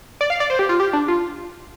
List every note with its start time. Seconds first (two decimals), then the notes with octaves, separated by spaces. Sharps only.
0.21 D5
0.30 F5
0.40 D5
0.50 C5
0.59 G4
0.69 F4
0.80 G4
0.93 D4
1.08 F4